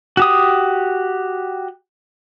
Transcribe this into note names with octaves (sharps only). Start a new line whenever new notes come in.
F#4 G4 D#6